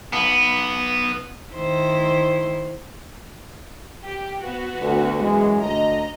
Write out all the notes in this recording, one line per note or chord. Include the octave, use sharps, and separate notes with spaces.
B1 B3
D#3 E4 C5
G4
B3 F#4
D2
F#2 E3 G#3
D2 D#5 A#5